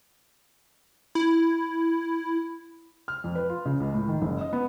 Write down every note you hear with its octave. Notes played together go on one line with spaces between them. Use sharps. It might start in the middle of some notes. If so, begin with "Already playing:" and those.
E4
F6
F2
B4
F4
C#3
C#2
A2
D#3
F#1
D#5
B3